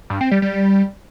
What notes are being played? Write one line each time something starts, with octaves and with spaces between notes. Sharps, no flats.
G2
C4
G3
G3